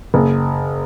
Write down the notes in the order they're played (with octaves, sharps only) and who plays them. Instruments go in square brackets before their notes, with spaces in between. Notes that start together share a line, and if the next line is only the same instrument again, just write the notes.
[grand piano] F#1